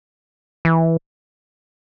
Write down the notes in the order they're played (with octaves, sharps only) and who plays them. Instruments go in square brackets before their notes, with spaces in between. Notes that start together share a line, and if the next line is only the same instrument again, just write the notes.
[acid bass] E3